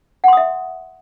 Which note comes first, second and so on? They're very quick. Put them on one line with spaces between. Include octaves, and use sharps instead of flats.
F#5 C6 D#6 E5